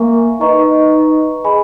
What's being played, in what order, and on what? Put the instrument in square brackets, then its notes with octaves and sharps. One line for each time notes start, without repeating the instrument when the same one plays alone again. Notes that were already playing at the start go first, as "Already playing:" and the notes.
Already playing: [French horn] A#3 [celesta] A#4 E5 G#5 C#6
[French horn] D#4 [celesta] B4 D#5 A#5 C#6
[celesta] G#4 D#5 G#5 B5